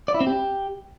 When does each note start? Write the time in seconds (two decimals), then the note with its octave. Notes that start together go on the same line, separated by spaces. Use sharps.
0.08 D5
0.14 E4
0.21 C4
0.27 G4